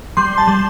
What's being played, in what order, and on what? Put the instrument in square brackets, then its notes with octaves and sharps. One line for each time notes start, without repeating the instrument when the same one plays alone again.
[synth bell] G3 C6
A5
G3